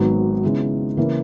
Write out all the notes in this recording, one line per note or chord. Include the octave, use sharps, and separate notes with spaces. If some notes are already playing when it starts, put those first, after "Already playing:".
Already playing: G#1 G#2 F#3 B3
C#3 G#3 B3 E4
C#3 E3 A#3